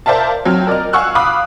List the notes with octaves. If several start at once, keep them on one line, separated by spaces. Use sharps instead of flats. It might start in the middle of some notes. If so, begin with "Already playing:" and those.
A#4 C5 D5 E5 F5 A5
F#3 C4 G5 F6
A#4 D5 D#5 F6
F5 F#5 G#5 C#6 E6 F#6
F5 B5 D6 D#6 F#6